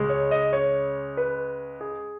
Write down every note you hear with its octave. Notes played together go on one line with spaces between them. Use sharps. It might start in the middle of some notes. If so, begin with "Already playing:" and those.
Already playing: C#2 C#3 G#3
C#5
D#5
C#5
B4
G#4